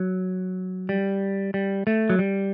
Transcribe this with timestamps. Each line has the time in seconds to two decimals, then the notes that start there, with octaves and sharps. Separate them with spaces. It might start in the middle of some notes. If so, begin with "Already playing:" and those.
Already playing: F#3
0.89 G3
1.54 G3
1.87 A3
2.10 F#3
2.19 G3